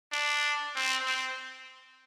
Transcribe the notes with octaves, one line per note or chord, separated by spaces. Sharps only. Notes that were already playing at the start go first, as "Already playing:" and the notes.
D4
C4
C4